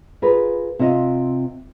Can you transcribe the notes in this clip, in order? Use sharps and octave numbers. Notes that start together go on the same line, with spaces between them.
F4 G#4 A#4 B4
C3 C4 F4 D#5